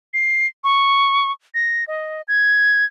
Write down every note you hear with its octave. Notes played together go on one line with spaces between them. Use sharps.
C7
C#6
A#6
D#5
G#6